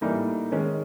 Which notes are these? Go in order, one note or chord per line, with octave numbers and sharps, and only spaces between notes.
A2 E3 G3 A#3 D#4
D#3 G#3 C#4